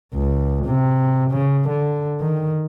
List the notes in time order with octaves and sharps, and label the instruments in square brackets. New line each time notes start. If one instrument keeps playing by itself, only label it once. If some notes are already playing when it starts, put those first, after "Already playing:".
[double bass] C#2
C3
C#3
D3
D#3